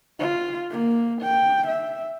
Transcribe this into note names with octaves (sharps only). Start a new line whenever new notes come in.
F4
A#3
G5
E5